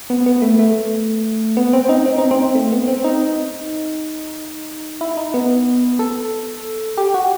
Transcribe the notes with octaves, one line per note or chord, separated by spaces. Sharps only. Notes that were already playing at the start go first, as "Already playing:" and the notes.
B3
B3
A3
A3
B3
C4
D#4
C4
D#4
C4
A3
B3
C4
D#4
E4
D#4
B3
A4
G4
F#4